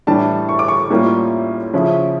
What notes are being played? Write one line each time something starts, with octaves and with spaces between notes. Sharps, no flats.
A2 E3 G3 D4 A5
C#6
D6
C#6
A2 G3 A#3 C#4 F4
C#3 F3 C#4 E4